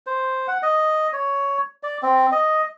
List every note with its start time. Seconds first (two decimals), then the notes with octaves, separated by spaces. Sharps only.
0.07 C5
0.48 F#5
0.63 D#5
1.13 C#5
1.83 D5
2.02 C4
2.32 D#5